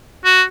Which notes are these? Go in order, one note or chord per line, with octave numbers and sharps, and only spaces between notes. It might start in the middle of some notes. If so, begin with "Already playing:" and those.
F#4